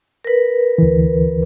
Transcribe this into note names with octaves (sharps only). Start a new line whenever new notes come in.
A#4 B4
D2 E3